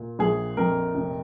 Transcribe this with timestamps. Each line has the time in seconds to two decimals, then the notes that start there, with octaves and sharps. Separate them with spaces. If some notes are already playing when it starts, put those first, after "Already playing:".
Already playing: A#2
0.19 A#1 G#4
0.57 F2 A#4
0.95 F1